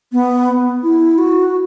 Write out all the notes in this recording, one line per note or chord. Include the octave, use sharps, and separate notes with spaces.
B3
E4
F#4